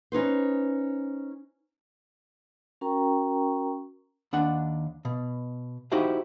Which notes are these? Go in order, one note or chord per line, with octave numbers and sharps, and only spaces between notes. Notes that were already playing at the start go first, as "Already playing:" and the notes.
C#4 D#4 B4 C5
C#4 F#4 A#4 G5 A#5 C#6
D#2 D4 F#5
B2
D#4 E4 F#4 G4 C5 F5